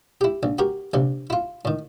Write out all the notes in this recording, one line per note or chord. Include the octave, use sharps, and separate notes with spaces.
E4 G4
A#1
F#4 G4 A#4
A#1 C3
E4 F4
A2 D#3